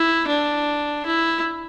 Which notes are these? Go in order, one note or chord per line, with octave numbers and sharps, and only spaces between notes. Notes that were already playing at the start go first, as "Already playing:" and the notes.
Already playing: E4
D4
E4